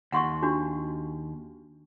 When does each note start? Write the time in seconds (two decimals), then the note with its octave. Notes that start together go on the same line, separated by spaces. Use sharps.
0.12 D#2 F#5 C6 C#6
0.42 D4 F#4 G4